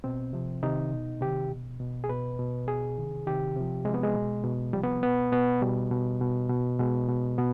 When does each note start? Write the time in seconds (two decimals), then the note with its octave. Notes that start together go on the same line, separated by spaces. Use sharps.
0.04 B2 C4
0.33 C3 F3
0.63 C3 D#3 D#4
0.92 B2
1.21 C3 D#3 G4
1.50 B2
1.80 B2
2.04 G#4
2.09 B2 B4
2.39 B2
2.68 B2 G#4
2.98 C3 D#3
3.27 C3 D#3 G4
3.57 C3 F3
3.85 C3 F3 G#3
3.94 B3
4.03 G#3
4.15 B2
4.44 B2
4.73 C3 F3 G3
4.83 B3
5.03 B2 B3
5.32 B2 B3
5.62 B2 G3
5.91 B2
6.21 B2
6.50 B2
6.79 B2 G#3
7.09 B2
7.38 B2 B3